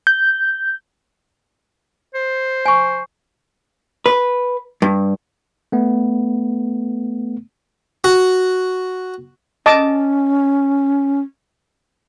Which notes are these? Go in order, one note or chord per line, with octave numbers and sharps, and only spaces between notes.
G6
C5
G#5 C#6
B4
G2
A3 B3
F#4
C#4 D#5 A5 D6